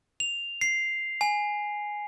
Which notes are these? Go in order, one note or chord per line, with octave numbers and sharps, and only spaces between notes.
F7
C7
G#5